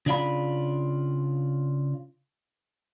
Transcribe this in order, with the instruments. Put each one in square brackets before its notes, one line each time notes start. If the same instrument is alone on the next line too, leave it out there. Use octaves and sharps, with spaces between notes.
[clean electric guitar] C#3 D4 F4 B5